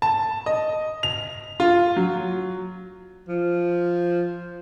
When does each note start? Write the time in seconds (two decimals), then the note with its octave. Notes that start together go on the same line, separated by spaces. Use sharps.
0.02 A5
0.46 D#5
1.03 F7
1.60 F4
1.96 F#3
3.28 F3